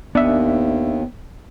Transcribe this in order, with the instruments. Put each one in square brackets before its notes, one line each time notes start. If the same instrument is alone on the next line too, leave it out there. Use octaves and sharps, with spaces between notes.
[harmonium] D#2 [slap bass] B3 [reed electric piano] D4 E5